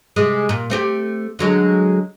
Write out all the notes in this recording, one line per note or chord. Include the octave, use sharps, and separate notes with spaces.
C3 G#3 G#4
A#2
A3 C4 G4
D3 F#3 G#3